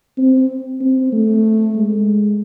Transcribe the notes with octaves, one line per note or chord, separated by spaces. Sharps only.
C4
C4
A3
G#3